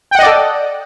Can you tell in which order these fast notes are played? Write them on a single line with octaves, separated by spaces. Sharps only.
G5 F#5 D#5 D5 A4